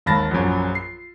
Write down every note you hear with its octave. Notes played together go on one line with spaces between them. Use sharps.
G#1 D#2 A5 B5 A6 A#6
A#1 F#2
C7